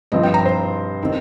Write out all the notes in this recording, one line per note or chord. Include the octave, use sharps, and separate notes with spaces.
G2 F3 C4 D#5
G5
A#5
C5
D#3 C4